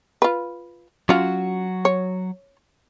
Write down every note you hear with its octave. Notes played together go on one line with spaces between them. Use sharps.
F4 B4
F#3 C#4 F4 F#4
C#5